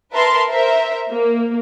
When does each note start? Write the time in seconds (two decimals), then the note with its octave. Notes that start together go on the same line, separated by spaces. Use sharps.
0.13 A#4 B4 E5 A5 C6
0.51 A#4 C5 E5
1.12 A#3